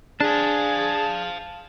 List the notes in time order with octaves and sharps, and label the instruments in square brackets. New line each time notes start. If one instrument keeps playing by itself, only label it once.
[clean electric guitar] D4 [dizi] G#4 [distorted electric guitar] F5 A5